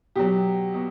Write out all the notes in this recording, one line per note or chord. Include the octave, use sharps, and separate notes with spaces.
B2 F#3 G4
B2